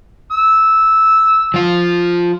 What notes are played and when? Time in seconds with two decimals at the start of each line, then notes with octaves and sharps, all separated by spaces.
0.32 E6
1.54 F3 F4